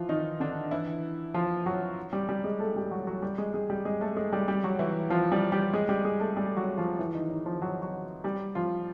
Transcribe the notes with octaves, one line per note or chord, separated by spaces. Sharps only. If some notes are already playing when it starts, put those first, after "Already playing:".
Already playing: E3 F3 F4
D#3 D#4
D3 D4
E3 E4
F3 F4
F#3 F#4
G3 G4
G3 G4
G#3 G#4
A3 A4
G3 G4
F#3 F#4
F#3 F#4
G3 G4
G#3 G#4
G#3 G#4
G3 G4
G#3 G#4
A3 A4
G#3 G#4
G3 G4
G3 G4
F#3 F#4
E3 E4
F3 F4
G3 G4
G3 G4
G#3 G#4
G3 G4
G#3 G#4
A3 A4
G3 G4
F#3 F#4
F3 F4
E3 E4
D#3 D#4
D#3 D#4
F3 F4
F#3 F#4
F#3 F#4
G3 G4
F3 F4